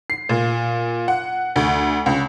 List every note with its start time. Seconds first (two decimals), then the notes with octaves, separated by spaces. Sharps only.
0.10 C7
0.29 A#2
1.08 F#5
1.56 D2
2.06 C#2